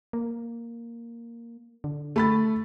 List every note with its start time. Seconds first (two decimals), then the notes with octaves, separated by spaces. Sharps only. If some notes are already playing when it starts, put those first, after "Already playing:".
0.13 A#3
1.84 D3
2.16 A3 B5 A6